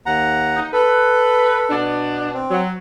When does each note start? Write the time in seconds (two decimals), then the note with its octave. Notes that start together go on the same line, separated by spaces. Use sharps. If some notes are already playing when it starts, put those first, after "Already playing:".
0.06 D#2 F#5 A#5
0.56 D#4
0.73 A4 B4
1.70 B2 B3 D4
2.33 C4
2.51 F#3